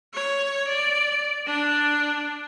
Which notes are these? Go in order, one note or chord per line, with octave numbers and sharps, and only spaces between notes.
C#5
D5
D4